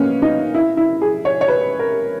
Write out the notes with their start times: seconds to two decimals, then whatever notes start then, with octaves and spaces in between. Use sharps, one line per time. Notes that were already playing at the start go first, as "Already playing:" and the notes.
Already playing: A#3 B3 C#4
0.22 D#4
0.54 E4
0.77 E4
1.02 G#4
1.25 C#5
1.41 C#5
1.48 B4
1.79 A#4